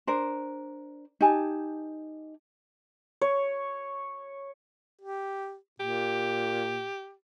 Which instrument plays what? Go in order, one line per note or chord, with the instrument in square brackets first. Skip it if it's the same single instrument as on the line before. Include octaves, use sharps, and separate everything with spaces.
[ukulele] D4 A#4 C5
D#4 G4 G#5 A5
[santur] C#5
[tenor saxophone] G4
[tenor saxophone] A#2 [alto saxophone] G4